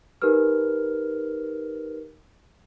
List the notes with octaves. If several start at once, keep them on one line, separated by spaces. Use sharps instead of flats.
D#4 G4 A#4 B4 F6